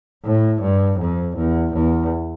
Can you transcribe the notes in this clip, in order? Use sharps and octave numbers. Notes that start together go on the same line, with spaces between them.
A2
G2
F2
E2
E2